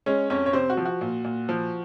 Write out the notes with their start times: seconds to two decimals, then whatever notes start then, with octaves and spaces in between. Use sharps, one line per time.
0.06 G#3 C#4 C#5
0.30 F2 C#4 C#5
0.46 C#5
0.53 C3 C4 C5
0.70 F#4
0.77 F3
0.85 F#4
1.01 A#2
1.24 A#2
1.49 F3